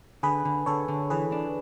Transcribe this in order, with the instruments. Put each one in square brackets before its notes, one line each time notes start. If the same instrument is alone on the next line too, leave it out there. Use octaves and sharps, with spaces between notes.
[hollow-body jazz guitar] D3 [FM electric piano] G#4 B4
[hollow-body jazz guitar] D3
[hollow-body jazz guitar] D3 [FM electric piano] A4 C#5
[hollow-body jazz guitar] D3
[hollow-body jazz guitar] E3 [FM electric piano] G#4 B4
[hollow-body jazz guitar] D4